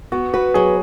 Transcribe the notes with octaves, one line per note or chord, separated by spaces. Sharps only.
B3 F#4
F#4 B4
F#3 G#4